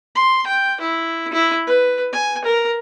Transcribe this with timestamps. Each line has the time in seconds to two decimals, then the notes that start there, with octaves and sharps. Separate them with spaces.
0.15 C6
0.47 G5
0.80 E4
1.33 E4
1.67 B4
2.12 G#5
2.44 A#4